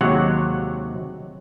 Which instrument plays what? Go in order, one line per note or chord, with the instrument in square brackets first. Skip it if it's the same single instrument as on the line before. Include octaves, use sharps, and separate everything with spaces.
[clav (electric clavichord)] D#2 C3 F#3 G#3 C#5 F#5